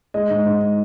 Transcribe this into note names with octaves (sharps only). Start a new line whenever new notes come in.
G#3 D#5
G#2
G#2